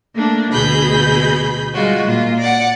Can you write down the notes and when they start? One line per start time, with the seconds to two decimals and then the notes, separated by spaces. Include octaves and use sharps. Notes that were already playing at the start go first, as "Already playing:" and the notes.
0.15 A3 A#3 D4
0.51 D2 B2 G#4 B5 G6
1.74 G3 G#3 F4 F#4
2.05 A#2 F4
2.40 D5 F#5